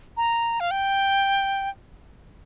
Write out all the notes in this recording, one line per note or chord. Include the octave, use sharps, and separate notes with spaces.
A#5
F5
G5